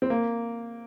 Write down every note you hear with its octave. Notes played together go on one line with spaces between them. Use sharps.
C4
A#3